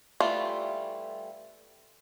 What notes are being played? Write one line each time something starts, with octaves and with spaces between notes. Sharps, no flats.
E3 G3 A3 F4